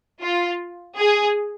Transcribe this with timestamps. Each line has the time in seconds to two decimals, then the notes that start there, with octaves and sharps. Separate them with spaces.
0.22 F4
0.98 G#4